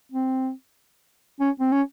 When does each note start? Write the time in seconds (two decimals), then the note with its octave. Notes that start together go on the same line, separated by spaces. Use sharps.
0.12 C4
1.40 C#4
1.60 C4
1.72 C#4